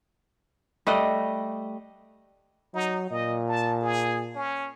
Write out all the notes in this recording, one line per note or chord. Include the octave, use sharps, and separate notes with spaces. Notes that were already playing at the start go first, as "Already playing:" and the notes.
G3 A3 D#5 F#5
F#3 D#4
A#2 D#5
A5
G#4
C#4